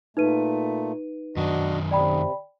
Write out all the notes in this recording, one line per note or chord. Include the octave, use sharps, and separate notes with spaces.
A#2 A3 D#4 B4 D#7
F#2 D#3 D4 F#4 D#5
C3 D5 G5 B5